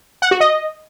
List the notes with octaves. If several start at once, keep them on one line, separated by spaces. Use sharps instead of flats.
F#5
F#4
D#5